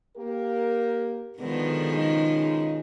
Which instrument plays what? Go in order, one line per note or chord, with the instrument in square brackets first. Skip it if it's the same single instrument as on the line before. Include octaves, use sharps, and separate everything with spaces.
[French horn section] A#3 G4 A#4
[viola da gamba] B2 D#3 F3 [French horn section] D3 G#3 B3
[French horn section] C#3 G#3 D#4